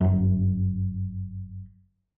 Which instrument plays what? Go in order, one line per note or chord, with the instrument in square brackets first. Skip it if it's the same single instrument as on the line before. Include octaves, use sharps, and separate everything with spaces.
[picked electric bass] G1 F#2